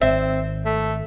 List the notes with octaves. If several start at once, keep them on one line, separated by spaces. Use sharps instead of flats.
G#1 C4 E5
A3